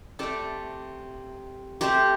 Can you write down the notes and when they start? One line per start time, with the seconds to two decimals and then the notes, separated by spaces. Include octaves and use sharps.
0.19 C3 A3 A4 D5
1.81 C3 A3 G4 C5